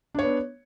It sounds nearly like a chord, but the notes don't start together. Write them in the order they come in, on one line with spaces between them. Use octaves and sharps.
D4 C#5 B3